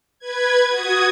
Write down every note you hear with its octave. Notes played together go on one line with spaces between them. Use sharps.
B4 G#6
F#4 D#6 G#6